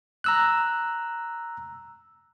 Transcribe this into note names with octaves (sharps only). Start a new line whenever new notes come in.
A#5 E6 F#6